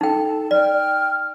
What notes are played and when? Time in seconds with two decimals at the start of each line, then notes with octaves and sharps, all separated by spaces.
0.01 D#4 A4 G5 A5
0.51 D5 G5 F6